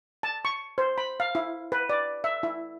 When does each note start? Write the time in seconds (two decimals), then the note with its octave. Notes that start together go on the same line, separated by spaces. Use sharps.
0.23 A5
0.45 C#6
0.78 C5
0.98 B5
1.20 F5
1.35 E4
1.72 B4
1.90 D5
2.24 E5
2.43 E4